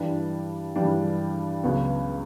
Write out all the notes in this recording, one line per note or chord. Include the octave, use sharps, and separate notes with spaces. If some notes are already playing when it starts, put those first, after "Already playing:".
Already playing: G2 E3 G3 D4
G2 E3 G3 D4
C#2 C#3 F#3 B3